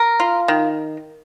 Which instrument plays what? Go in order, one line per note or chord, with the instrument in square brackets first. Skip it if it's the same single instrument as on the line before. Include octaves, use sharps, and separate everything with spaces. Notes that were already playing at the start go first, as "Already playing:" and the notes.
Already playing: [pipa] A#4
F4
D#3